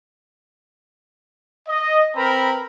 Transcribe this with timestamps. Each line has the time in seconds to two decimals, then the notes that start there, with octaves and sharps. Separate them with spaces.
1.68 D#5
2.16 C4 A#4 B4 A#5 B5